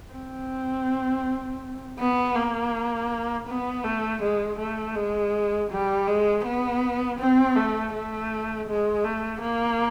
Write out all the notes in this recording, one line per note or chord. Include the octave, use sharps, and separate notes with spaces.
C4
B3
A#3
B3
A3
G#3
A3
G#3
G3
G#3
B3
C4
A3
A3
G#3
A3
A#3